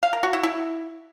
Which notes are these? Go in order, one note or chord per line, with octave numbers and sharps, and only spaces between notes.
F5
A#4
F#4
E4
E4